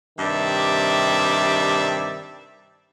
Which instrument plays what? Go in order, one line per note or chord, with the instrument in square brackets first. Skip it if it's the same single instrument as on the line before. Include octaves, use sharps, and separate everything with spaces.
[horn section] G2 C3 D#3 G4 D5 E5